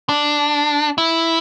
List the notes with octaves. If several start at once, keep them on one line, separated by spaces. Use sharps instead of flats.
D4
E4